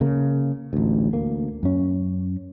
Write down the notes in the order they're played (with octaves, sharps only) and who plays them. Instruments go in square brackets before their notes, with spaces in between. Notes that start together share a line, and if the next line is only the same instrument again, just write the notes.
[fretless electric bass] C#3 A#3
A1 D2
D2 A#3
F#2 C#4